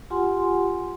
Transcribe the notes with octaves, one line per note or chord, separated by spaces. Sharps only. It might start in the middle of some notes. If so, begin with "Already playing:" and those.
F4 G4 F#5 G#5 C6